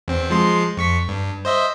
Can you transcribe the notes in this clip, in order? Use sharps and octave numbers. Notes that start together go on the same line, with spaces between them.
E2 C4
F3 G#3 C6
F2 C#6 B6
G2
C5 D#5 E5